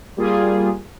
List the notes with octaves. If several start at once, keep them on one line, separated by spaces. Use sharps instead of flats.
G3 A#3 F4 G#4